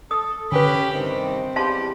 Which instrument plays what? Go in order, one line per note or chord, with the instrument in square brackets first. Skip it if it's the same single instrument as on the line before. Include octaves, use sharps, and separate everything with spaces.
[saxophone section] A4 [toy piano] D#6
[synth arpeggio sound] D3 B4 [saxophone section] C#4 [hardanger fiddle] G4 B5
[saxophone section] G2 C3 D#3 [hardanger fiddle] C4
[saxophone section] E2 G3 G4 [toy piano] F5 A5 C6